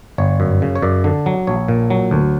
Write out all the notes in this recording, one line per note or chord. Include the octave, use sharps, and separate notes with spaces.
G1 C#5
F#2
C#3
C#5
F#2 D5
D3
F#3
A#1 C#5
A#2
F#3
D2